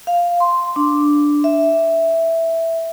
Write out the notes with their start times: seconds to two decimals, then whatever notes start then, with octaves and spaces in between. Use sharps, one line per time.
0.07 F5
0.40 C6
0.76 D4
1.44 E5